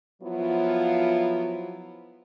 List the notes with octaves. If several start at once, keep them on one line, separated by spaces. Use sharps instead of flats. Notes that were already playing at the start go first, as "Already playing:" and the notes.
F3 F#3 B3 E4 F4